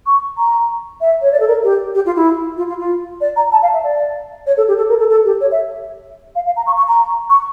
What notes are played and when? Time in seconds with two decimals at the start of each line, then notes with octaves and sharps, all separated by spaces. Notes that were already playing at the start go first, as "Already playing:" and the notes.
0.06 C#6
0.38 A#5
1.01 E5
1.22 C#5
1.32 D5
1.40 A4
1.47 A#4
1.63 G4
1.95 G4
2.05 F4
2.16 E4
2.57 F4
2.68 F4
2.79 F4
3.21 D5
3.36 A#5
3.52 A5
3.62 F5
3.73 E5
3.83 D5
4.46 C#5
4.57 A4
4.68 G4
4.77 A4
4.89 A#4
4.99 A4
5.09 A4
5.25 G4
5.41 C#5
5.52 E5
6.35 F5
6.46 F5
6.56 A#5
6.66 C#6
6.77 C#6
6.88 A#5
7.29 C#6